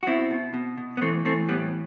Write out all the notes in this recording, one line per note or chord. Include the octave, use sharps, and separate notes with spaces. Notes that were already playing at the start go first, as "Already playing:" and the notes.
F#4
B2 C4 E4
B2
B2
B2
B3
E3 A3 C4
E3 A3 C4
A2 G3 B3